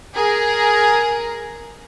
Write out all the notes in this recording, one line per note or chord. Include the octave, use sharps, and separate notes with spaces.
G#4 A#4